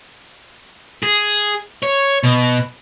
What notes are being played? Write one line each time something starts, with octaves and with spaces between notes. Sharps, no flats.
G#4
C#5
B2